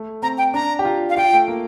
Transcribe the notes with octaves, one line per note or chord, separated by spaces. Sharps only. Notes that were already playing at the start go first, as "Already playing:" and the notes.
Already playing: A3
C4 A#5
G5
D4 A#5
G4
F4
F5
F4 G5
A3
A#3